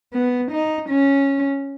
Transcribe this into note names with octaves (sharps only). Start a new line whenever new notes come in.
B3
D#4
C#4